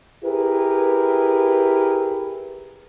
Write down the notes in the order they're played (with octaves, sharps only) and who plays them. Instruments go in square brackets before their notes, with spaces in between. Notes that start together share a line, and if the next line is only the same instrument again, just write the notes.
[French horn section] E4 G4 G#4 A#4 B4